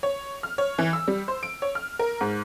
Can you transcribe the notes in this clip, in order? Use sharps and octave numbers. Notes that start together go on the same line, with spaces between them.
C#5
F6
C#5
E3
E6
G3
C5
D7
C#5
F6
A#4
G#2